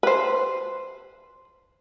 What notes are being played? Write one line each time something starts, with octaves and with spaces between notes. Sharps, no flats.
B4 C5